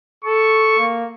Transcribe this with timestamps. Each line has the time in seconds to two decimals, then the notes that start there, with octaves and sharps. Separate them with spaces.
0.24 A4 C#6
0.79 A#3